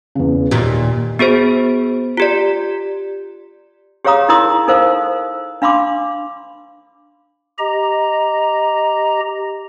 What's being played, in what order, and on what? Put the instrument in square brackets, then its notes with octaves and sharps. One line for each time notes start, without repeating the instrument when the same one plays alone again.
[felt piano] E2 C#3
[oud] D#2 A#2 [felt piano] G4
[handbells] B3 F#4 G#4 C5
F4 G4 D5
[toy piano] G4 G#4 C#5 F5 A#5 D#6
D#4 E4 A#4 A#5 C6 D#6
D#4 A4 A#4 C5 F5
D4 F5 B5 C6 D6
[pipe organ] G4 D#5 A#5